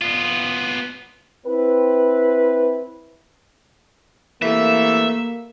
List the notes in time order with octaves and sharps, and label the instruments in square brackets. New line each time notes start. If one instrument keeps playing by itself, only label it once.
[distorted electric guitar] B3 F4
[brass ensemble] C4 E4 B4
[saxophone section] C3 E3 A3 [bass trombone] A#3 [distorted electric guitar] E5